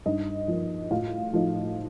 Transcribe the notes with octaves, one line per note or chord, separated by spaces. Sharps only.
G2 D#4 D#5
F3 A#3
A2 F4 F5
F3 A3 D#4